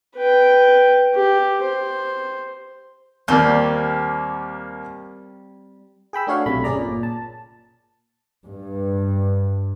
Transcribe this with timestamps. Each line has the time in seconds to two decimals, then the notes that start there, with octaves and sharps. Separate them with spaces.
0.16 B4 G5
1.15 G4
1.62 C5
3.28 D#2 G3 A#3 C4
6.13 G#4 G5 B5 E6
6.27 A3 D4 F#4 C#5 F5
6.46 B1 C3 A3 B5
6.64 G1 C#4 G#4 D5 A#5
6.78 A#2
7.03 A5
8.46 G2